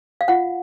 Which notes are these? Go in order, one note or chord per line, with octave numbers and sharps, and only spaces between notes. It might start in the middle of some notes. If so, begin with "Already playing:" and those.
F5
F4 F#5